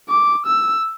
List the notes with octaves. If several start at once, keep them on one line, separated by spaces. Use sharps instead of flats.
D6
E6